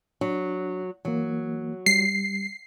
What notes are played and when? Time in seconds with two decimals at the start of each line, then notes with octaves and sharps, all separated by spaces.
0.21 F#3 D4
1.05 E3 F#3 A#3
1.86 G3 C7